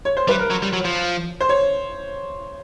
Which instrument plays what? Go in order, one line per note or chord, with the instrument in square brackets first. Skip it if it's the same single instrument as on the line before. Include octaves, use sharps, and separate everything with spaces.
[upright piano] C#5
C5
[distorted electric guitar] G3 [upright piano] B4
[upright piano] A#4
[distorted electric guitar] F#3
G3
F#3
F3
[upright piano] C5
C#5